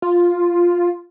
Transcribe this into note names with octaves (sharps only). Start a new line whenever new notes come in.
F4